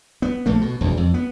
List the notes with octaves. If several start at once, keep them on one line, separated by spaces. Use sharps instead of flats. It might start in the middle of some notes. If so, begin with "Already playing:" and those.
B3
A#1 A3 A#3
B2
E1 D2
F2
B3